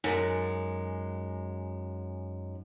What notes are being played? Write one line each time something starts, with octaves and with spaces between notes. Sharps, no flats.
F#2 G#3 D#4 G#5 C#7